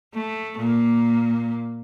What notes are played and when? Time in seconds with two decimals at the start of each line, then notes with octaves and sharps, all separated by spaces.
0.14 A3
0.58 A#2 A#3